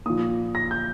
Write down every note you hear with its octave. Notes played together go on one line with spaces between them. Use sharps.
A#2 F3 D#6
A#6
G6